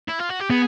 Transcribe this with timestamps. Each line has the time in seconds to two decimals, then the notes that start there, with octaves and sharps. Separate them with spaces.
0.08 E4
0.19 F4
0.29 F#4
0.40 G4
0.50 B3 G#4